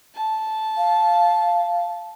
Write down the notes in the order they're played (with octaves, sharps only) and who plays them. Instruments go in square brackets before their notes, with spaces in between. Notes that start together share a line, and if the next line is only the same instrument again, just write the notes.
[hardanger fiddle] A5
[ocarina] F5